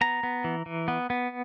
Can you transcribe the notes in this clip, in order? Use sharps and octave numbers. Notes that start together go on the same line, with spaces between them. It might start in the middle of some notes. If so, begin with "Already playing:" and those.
B3 A#5
B3
E3
E3
B3
B3